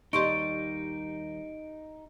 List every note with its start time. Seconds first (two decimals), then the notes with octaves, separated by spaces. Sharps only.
0.13 D#2 G3 D#4 G4 D#5 C6 C#6 D7